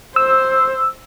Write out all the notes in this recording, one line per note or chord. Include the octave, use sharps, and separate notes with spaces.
C5 E6